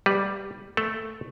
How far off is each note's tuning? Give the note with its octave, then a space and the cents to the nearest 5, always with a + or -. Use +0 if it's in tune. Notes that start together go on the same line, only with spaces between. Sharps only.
G3 +0 B4 +0
A3 +0 A4 +0 A5 +0